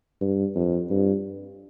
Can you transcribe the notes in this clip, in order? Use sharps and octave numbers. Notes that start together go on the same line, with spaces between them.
G2
F2
G2